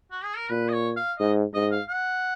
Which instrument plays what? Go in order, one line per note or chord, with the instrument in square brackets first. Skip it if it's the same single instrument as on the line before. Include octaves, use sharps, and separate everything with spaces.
[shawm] F#4
G#4
A#4
[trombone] A#2 [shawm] B4
[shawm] D#5
C#5
F5
[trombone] G#2 [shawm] D#5
[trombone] G#2 [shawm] D#5
[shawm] F5
F#5